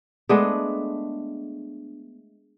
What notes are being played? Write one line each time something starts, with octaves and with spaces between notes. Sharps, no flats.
G#3 A3 B3 D4